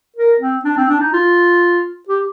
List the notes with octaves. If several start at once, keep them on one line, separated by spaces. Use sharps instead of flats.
A#4
C4
D4
C4
D4
D#4
F4
G4